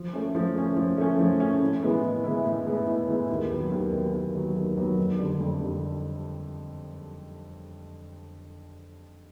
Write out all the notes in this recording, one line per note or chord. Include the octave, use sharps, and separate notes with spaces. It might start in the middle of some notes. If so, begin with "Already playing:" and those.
Already playing: F3
A3 C#4
F3
A3 C#4
F3
A3 C#4
F3
A3 C#4
A2
E3 G#3 B3 E4
A2
E3 G#3 B3 E4
A2
E3 G#3 B3 E4
A2
E3 G#3 B3 E4
D#2
D#3 F#3 B3
D#2
D#3 F#3 B3
D#2
D#3 F#3 B3
D#2
D#3 F#3 B3
F2
D3 G3
F2
D3 G3